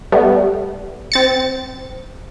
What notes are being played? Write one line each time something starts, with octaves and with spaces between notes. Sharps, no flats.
G3 A3 B3
C4 A6 C#7